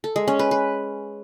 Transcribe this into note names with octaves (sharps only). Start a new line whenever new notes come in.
A4
G#3
C#4
B4
B4